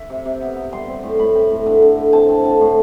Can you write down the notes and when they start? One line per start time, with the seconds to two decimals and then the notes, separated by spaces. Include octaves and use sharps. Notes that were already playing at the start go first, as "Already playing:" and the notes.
Already playing: E5
0.10 C3
0.25 C3
0.42 B3
0.56 B3
0.73 G3 C6
0.88 C4
1.03 A2
1.19 A2 B5
1.35 C4
1.50 A2
1.66 D3
1.82 D3
1.98 D3
2.13 C4 A5
2.29 C4
2.45 D3
2.60 A2